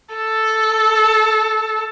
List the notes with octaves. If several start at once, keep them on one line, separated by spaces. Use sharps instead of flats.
A4